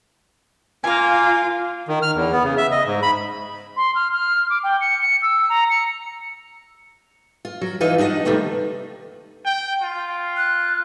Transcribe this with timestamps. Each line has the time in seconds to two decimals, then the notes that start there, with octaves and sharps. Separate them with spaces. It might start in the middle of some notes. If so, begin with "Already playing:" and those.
0.84 A#3 F4 F5 G#5
1.88 D#3
2.02 F6
2.15 E2
2.32 B3
2.44 C#3
2.57 E5
2.72 D#5
2.86 G#2
3.02 B5
3.77 C6
3.95 F6
4.13 F6
4.50 D6
4.63 G5
4.81 C#7
5.02 C#7
5.22 E6
5.49 A#5
5.70 C#7
7.45 F4
7.61 F#3
7.80 E3 D#4 F4 B4
7.98 D4 D#4 G#4 D#5 F#5
8.25 C3 D#3 G3 A3 B3
9.46 G5
9.82 F4
10.37 F#6